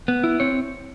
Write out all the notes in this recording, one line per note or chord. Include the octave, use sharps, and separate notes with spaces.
B3
E4
C4 C#5